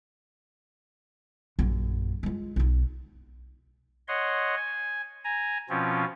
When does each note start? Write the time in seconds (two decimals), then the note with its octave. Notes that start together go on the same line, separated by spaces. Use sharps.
1.59 A#1 F#2
2.23 G#3 F4
2.56 B1 D#4
4.08 C#5 D#5 F#5 C6
4.56 G#5
5.25 G#5 A#5
5.70 B2 F3 C4 C#4 F4